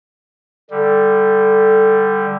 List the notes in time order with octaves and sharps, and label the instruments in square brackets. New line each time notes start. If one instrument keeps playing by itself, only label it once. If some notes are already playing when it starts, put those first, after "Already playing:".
[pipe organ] D3 G3 [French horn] A4